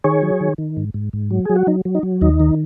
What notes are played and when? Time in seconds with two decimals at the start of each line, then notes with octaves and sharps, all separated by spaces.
0.04 D#3 G#4 C#5
0.22 F#3
0.41 D#3
0.58 D#3
0.77 G#2
0.94 G#2
1.13 G#2
1.31 F#3
1.45 F#3 G#4
1.56 F#4
1.67 F#3 D#4
1.85 F#3
1.95 D#4
2.03 F#3
2.21 D#2 D#4
2.40 D#3